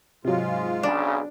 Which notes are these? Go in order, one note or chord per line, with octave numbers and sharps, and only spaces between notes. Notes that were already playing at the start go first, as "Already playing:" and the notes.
G#2 C3 F#3 G#3 F4
B1 C#3 D4